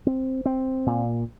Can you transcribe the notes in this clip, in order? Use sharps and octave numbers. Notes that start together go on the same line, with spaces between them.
C4
C4
A#2